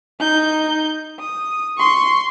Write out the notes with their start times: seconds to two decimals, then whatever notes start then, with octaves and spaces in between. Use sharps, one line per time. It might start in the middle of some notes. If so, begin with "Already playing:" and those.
0.20 D#4 G6
1.20 D#6
1.77 C6 C#6